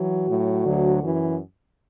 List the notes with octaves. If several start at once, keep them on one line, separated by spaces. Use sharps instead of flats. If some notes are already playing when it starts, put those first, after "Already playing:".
Already playing: E3 F#3 F#4
A2 F#3
D2 D3 F#3
F#2 E3